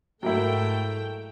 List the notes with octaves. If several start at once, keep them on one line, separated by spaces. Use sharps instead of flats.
G#2 F#3 A3 A#3 E4 G5